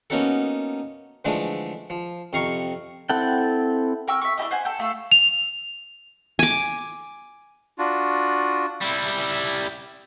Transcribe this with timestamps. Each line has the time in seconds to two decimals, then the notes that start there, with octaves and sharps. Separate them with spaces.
0.10 A#3 B3 C#4 D#4 F#4 A4
1.25 D3 E3 F3 G#3 A3 D4
1.90 F3
2.33 F2 C3 F5 A#5 C#6
3.09 C4 E4 A4 F#5 G5
4.08 A#4 G5 C#6 E6
4.21 E5 C#6
4.38 D4 E4 G4 D#5
4.51 C5 F#5 G#5
4.65 A4 G5
4.79 A3 F4 A4
5.12 F7
6.39 G#5 D6
7.78 D4 F4 F#4
8.82 G3 E4